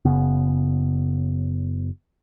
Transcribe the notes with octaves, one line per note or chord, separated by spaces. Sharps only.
F#1 C#3 B3